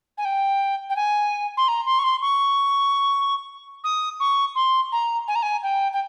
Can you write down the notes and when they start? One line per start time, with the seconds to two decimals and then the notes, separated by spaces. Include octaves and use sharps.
0.18 G#5
0.25 G5
0.90 G5
0.96 G#5
1.57 C6
1.68 A#5
1.86 C6
1.99 C#6
2.04 C6
2.22 C#6
3.84 D#6
4.20 C#6
4.55 C6
4.92 A#5
5.28 G#5
5.35 A#5
5.43 G#5
5.63 G5
5.93 G5